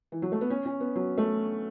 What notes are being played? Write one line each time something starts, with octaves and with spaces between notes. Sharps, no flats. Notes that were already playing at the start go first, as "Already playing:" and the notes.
E3
F#3
A3
B3
C#4
C#4
B3
F#3
A3